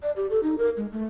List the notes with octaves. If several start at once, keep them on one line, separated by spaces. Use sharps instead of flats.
D5
G4
A4
D#4
A#4
G#3
A3